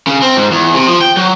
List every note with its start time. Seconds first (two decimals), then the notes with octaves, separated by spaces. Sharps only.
0.07 C#3
0.22 C4
0.37 G#2
0.51 E2
0.74 C3
0.88 F3
1.01 G5
1.17 F#3